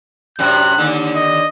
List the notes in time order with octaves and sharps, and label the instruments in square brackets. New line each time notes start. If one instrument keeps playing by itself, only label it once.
[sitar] F#2 A2 C3 [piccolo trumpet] F#6
[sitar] D#2 D3
[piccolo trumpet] D#5